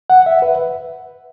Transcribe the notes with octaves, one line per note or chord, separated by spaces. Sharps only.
F#5
E5
B4